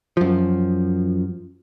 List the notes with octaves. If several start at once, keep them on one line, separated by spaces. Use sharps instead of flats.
F#2 F3